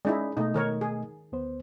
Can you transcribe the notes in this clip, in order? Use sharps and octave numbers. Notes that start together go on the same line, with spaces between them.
G#3 C#4 D#4 E4 D5
B2 A3 D#4 D#5
D#3 A#4 C#5
G#4
D2 B3 C5